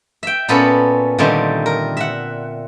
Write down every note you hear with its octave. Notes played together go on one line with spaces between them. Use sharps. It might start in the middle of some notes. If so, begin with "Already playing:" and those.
E5 G5
A#2 B3 C#4 A4 B5
A#2 D3 D#3 G3 A3 C4
A#4
E5 F#5